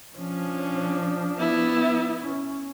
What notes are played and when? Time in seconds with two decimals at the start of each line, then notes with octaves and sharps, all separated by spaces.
0.18 F3 C#4 D4
1.38 B3 E4
2.21 C#4